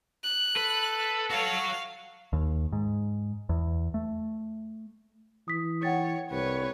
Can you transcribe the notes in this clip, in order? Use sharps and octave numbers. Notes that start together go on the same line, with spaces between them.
F#6
A4 B4
F#4 C#5 F5
D#2
G#2
E2
A3
E3 D#6 B6
C#5 F#5 G5 A6
C2 B4 C#5